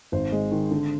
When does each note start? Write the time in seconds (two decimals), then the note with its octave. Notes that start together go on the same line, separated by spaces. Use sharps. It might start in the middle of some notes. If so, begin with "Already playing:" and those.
0.12 G#1 C5
0.32 G#3
0.51 D#3
0.71 D3